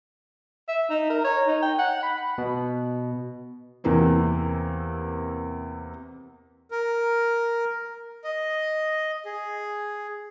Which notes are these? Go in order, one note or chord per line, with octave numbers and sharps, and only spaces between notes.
E5
D#4
A#4
C#5
D#4
G5
F#5
B5
B2
E2 C3 E3 A#3 C4
A#4
D#5
G#4